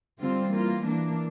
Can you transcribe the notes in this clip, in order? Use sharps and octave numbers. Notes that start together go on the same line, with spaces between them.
D3 G3 C4 F4
E3 A#3 F4
E3 A#3 D4